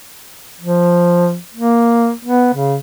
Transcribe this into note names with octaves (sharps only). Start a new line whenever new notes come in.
F3
A#3
B3
C#3